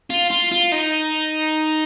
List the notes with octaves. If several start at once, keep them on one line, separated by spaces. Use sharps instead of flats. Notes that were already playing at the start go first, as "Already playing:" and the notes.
F4
F4
F4
D#4